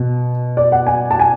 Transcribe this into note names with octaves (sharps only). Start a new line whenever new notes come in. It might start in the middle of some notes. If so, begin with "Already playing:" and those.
Already playing: B2
D5
F#5
G#5
A5
G#5